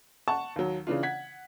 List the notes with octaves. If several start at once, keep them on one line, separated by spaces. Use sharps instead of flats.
F#5 A5 C#6
D#2 F#3
C#3 E3 D4 F4
F#5 G#6 B6